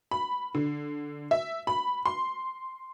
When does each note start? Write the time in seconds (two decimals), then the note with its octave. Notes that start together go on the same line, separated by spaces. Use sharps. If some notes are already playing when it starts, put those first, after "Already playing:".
0.11 B5
0.55 D3
1.31 E5
1.67 B5
2.06 C6